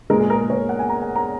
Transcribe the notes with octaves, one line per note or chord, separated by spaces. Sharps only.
A#2 G#3 A#4
G#4
A#4
C#5
F#5
G#5
A#5
F#5
A#5